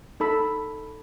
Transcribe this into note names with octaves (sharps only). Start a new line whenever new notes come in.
D#4 A4 B5 E6